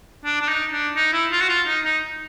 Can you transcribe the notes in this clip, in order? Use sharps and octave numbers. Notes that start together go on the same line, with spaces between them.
D4
D4
D#4
D4
D#4
E4
F4
F#4
F4
D#4
D#4